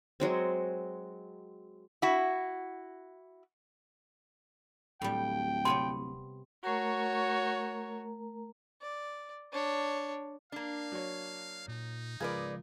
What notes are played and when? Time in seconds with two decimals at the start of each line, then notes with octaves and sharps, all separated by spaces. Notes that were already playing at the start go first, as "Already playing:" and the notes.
0.20 F#3 G#3 C4
2.02 E4 F#4
5.02 D1 A2 G3 G5
5.65 C3 B3 C#5 C6
6.64 A3 F#4 A#4 C#5 A#5
8.82 D5
9.52 D4 C#5
10.52 A#3 D4 F5
10.92 F#3 C#5
11.68 A#2 D#4
12.20 C#3 F3 G#3 F4 G#4 A#4 B4 D5